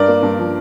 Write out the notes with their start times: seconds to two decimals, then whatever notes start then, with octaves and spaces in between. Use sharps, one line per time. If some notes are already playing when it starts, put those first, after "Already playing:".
Already playing: G2 A#4 D5
0.08 A#3
0.23 G2
0.39 F3